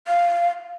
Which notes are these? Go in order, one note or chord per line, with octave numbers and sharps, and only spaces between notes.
F5